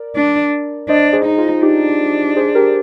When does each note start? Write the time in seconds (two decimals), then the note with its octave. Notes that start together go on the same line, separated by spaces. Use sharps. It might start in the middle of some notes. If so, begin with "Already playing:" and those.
Already playing: A#4 D5
0.16 D4
0.89 D4 C5 D#5
1.13 G#4 C5
1.25 D#4
1.37 F4 G#4
1.62 D4 D#4 G4
2.36 G#4 C5
2.55 G4 A#4